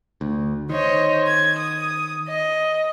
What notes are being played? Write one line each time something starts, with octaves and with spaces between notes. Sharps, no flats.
D2
D#3 C5 C#5 D#5
G#6
D#6
D#5